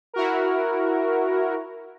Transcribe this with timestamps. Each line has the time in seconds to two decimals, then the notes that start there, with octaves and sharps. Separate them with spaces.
0.14 E4 F#4 A#4